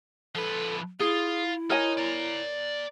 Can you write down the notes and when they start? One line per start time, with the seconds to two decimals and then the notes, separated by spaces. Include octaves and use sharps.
0.35 F3 A4 B4
1.00 E4 F4 G#4
1.70 D#4 A#4 C#5 G#5
1.97 D5 A#5